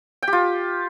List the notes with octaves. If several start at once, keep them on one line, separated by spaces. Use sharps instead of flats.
G5
G4
F4